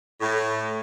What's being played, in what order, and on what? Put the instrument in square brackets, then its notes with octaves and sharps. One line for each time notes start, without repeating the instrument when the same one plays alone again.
[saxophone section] A2